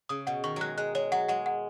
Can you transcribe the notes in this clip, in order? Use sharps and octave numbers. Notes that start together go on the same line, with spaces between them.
C#3 D#6
B2 F#5
D#3 C#6
F#3 G#3 F#6
G#3 F#6
G#3 C#5
F#3 F#5
G#3 F#5
F#5